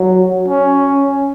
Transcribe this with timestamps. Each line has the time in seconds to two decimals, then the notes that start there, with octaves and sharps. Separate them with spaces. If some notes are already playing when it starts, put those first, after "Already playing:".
Already playing: F#3
0.48 C#4